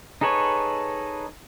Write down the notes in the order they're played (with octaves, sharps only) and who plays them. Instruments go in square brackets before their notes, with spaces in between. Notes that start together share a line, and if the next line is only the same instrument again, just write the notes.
[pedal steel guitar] D#4 G#4 A4 B4 C#5